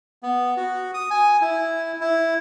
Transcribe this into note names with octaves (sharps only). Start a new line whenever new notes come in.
B3
F#4
D#6
G#5
E4
E4